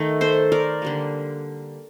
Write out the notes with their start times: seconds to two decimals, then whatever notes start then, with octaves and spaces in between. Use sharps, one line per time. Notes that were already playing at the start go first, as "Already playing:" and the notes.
Already playing: D#3 A3
0.21 A4 C5
0.52 A#4 D5
0.82 D3 G3 A#3